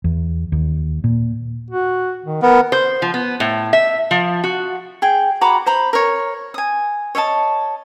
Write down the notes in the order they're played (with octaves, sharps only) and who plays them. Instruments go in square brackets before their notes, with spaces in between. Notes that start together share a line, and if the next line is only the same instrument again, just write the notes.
[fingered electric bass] E2
D#2
A#2
[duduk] F#4
D#3
[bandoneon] B3 [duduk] A#4
[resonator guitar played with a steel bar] C5
F3
B3
A2
E5
F3
F#4
[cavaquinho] G#4 G5
F#4 A#5 B5 D6
C5 A#5 B5
A#4 C#5
G#5 D#6
C#5 D#5 E5 A5